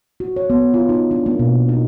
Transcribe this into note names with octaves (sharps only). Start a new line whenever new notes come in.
F#4
C#5
B3
F4
D#4
D4
A#3
B2
D#4